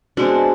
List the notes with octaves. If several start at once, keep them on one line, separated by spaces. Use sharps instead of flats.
B2 G#3 C4 D4